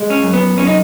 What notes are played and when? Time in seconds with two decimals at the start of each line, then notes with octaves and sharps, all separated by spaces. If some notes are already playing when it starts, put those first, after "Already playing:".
Already playing: G#3
0.10 C#4
0.22 F#2
0.34 B3
0.57 F#2 C#4
0.67 D#4